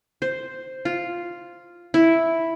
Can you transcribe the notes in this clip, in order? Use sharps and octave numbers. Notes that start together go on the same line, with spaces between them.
C5
F4
E4